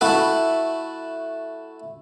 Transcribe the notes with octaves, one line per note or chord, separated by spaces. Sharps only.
A3 E4 F#4 A4 B5